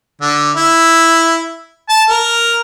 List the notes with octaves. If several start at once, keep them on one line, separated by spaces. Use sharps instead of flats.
D3
E4
A5
A#4